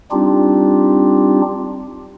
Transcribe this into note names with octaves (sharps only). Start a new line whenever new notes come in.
G3 C4 D4 D#4 F4 G4